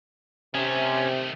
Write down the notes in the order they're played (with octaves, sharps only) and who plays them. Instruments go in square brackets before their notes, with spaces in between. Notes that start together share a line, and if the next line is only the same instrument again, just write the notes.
[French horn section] C3 [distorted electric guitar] D#3 A3 [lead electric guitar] C#4